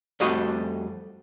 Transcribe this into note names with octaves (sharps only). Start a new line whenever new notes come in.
F2 G3 A3 F#4 D#5 B5